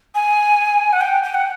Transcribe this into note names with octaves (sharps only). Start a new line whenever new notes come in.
G#5
F#5
G5
G5
F#5